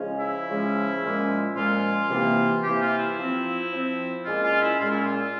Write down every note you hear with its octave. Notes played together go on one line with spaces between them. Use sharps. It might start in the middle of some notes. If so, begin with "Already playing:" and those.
Already playing: C#3 F3 G#3 C#4
E4
C#3 F3 G#3 C#4
A#2 F3 G#3 C#4
A#2 F3 G#3 C#4 F4
C3 E3 A#3
C3 E3 A#3 G4
F4
E4
F3 C4
F3 C4
A#2 G#3 C#4 F4
F4
E4
A#2 G#3 C#4 F4
E4
F4